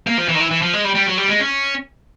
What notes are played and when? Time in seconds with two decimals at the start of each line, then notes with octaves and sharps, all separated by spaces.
0.07 A#3
0.18 F3
0.29 E3
0.35 D#3
0.40 E3
0.51 E3
0.62 F3
0.73 G#3
0.84 G3
0.95 G3
1.07 F#3
1.18 G3
1.28 G#3
1.40 C#4